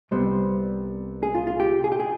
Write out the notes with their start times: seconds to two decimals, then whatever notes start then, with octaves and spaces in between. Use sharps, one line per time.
0.11 C2 C3 G3 B3 C5
1.23 G#4
1.35 F4
1.47 F4
1.60 G4
1.84 G#4
1.92 G4
2.00 G#4